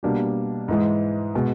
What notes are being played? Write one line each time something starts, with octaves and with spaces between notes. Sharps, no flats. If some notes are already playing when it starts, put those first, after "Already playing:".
B2 G3 A#3 D4 G4
G#2 E3 G#3
B2 G#3